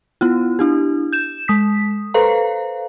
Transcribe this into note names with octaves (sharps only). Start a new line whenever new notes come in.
B3 E4 F4
D4 E4 G4
G6 E7
G#3 D#6 B6
A4 B4 C5 F5 A#5